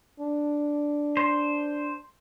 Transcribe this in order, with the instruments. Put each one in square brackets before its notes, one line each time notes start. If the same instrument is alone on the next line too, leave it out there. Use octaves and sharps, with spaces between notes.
[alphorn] D4
[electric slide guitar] C5